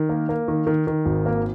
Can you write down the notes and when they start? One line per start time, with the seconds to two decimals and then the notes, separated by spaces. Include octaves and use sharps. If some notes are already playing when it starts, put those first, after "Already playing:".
Already playing: D#3
0.09 A#3
0.29 A#3
0.48 D#3
0.67 D#3
0.87 D#3
1.06 G#1
1.26 A#3